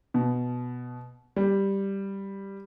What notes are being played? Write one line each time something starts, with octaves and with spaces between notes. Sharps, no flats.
B2
G3